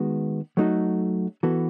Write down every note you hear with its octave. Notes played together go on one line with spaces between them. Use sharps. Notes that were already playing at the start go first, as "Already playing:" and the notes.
Already playing: D#3 G#3 B3 F#4
F#3 A3 D#4 F#4 A4
E3 B3 F#4 A4